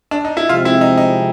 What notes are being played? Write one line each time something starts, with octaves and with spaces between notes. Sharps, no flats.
D4
D#4
E4
C3 F3 G#3 C4 F4
E4
D#4
D#4